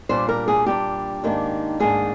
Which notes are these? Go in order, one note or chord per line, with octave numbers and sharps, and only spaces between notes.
A#2 G3 D4 C5
A#4
G#4
A#2 G3 D4 G4
G#2 D#3 A#3 D4
G#2 D#3 A#3 D4 G#4